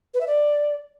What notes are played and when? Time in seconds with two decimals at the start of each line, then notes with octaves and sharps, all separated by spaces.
0.14 B4
0.20 E5
0.27 D5